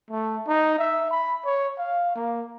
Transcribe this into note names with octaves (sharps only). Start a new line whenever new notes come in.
A3
D#4
E5
B5
C#5
F5
A#3